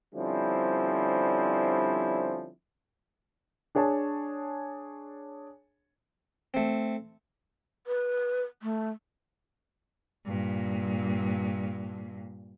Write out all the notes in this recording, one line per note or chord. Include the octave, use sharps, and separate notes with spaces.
D3 F3 G3 C4 C#4 E4
D4 G#4 C#5 G#5 A5
A3 C4
B4
A3
G2 A#2